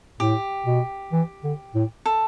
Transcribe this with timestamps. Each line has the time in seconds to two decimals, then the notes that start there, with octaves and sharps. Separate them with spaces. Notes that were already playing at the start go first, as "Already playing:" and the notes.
0.20 A2 G4
0.66 B2
1.13 E3
1.44 D3
1.75 A2
2.06 A4